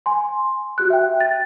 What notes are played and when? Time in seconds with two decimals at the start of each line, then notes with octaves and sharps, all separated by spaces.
0.06 G#5 C6
0.78 F#4 G4 F#6
0.90 E5 G5
1.21 A6